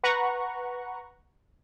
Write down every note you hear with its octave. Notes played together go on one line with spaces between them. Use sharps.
B4 F#5 A#5 C#6